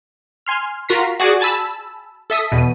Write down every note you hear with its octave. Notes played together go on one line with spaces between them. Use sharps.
G#5 C6 F6
F4 F#4 A#4 A#5 B6 C7
F#4 G#4 D5
G#5 A5 B5 E6
A4 E5 D#6 B6
E2 B2 D#7